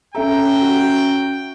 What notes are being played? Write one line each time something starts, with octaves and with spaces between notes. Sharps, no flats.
C#4 A4 E5 G5 A#5
F#4